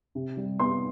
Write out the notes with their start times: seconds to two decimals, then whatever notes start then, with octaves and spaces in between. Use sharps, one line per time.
0.15 C3
0.37 G3
0.59 B3 C6